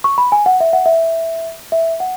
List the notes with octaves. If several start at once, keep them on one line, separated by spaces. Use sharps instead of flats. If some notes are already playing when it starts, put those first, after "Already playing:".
C#6
B5
G#5
F#5
E5
F#5
E5
E5
F#5